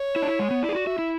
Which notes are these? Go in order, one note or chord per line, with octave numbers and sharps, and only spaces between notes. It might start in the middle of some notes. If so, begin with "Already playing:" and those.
Already playing: C#5
E4
D4
E4
G#3
B3
E4 D5
G#4
F#4
F#4 E5
E4